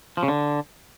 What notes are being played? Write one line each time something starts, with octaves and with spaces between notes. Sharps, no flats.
F3
C#3
D3